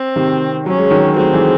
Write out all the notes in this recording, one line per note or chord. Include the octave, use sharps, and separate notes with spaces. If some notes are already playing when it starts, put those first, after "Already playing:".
Already playing: C4
C3 D#3
F#3 C#4
G#3
D#3 F#3
F#3 A3 C4
E3 G#3